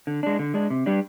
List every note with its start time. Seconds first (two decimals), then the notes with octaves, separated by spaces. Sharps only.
0.07 D3
0.23 G#3 D4
0.39 D3
0.54 G#3 D4
0.70 C3
0.86 G3 D4